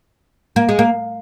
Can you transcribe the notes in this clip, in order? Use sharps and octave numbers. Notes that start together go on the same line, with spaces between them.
A#3
G#3
A#3